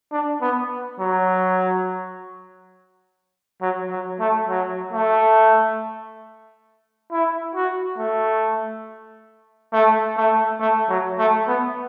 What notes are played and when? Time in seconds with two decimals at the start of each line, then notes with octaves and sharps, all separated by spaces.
0.12 D4
0.41 B3
1.00 F#3
3.61 F#3
3.91 F#3
4.19 A3
4.49 F#3
4.93 A3
7.11 E4
7.55 F#4
7.98 A3
9.73 A3
10.17 A3
10.60 A3
10.89 F#3
11.18 A3
11.48 B3